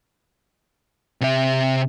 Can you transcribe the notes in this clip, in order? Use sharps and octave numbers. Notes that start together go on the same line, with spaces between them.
C3 E5